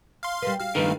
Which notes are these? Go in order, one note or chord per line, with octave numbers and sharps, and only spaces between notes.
F5 C6
G3 A#3 B4
F#4 F5
G2 D#3 A3 D#4 B4